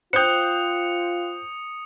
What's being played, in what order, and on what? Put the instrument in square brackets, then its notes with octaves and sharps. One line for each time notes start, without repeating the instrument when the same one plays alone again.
[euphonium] F4 [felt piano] C5 G6 [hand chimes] G5 F#6 [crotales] D#6 C#7